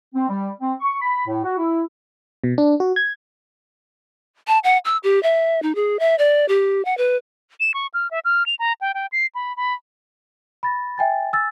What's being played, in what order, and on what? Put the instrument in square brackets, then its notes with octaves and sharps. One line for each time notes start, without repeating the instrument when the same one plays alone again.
[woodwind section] C4
G3
C4
C#6
B5
A2
F#4
E4
[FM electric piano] B2
D4
F#4
G#6
[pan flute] A5
F#5
E6
G4
E5
D#4
G#4
E5
D5
G4
F#5
B4
[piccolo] E7
C#6
F6
E5
F6
F7
A#5
G5
G5
C7
B5
B5
[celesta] B5 A6 A#6
E5 G5 G#5 A6
G#5 E6 A6